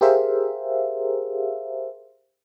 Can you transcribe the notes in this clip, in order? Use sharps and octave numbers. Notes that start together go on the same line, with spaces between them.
G4 G#4 A#4 C5 E5 F5